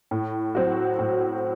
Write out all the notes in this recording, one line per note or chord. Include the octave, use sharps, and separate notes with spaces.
A2
F#3 C4 F#4
A2